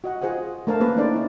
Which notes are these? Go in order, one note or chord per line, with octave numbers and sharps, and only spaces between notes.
F#4 D#5 F#5
F4 G#4 C5 D#5 F#5
A3 D4 A#4 C5 F5 A5
A#3 C#4 G#4 B4
A3 D4 D#4 C5 D5
C#4 E4